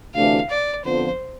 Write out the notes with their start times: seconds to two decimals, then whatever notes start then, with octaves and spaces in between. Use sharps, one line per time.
0.15 D2 C3 E3 A3 D4 F5
0.50 D5
0.85 F2 D3 F3 B3 F4 C5